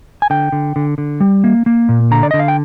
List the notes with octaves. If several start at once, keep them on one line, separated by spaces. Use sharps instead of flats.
G#5
D3 G5
D3
D3
D3
G3
A#3
A#3
A#2
D3 A#5
D5
D3 D#5
F5
G5